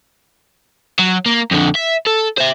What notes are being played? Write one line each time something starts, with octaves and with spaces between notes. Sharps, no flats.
F#3
A#3
F2 D3
E5
A4
C5 E5